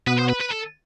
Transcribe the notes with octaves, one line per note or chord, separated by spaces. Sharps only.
B2 B3 B4
C5
B4
B4
A4